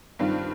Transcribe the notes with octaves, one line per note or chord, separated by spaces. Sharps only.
G2 D#3 G3 C4 F4